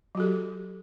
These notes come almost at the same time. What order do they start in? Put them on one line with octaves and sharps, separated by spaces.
F#3 F#4 A4 G4